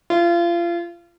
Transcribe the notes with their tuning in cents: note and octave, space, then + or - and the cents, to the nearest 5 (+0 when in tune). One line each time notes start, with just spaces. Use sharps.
F4 -30